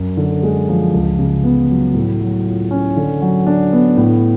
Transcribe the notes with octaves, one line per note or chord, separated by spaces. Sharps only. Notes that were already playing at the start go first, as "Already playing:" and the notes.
Already playing: F#2
D3
G#3
F3
C#2
C#3
B3
F#3
A2
F#3
F4
C#4
D3
F#3
D4
B3
A2